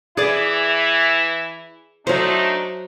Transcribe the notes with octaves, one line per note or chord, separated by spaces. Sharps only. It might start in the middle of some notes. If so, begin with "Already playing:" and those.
E3 E4 G#4 D5
F#3 A3 D4 D#4 C5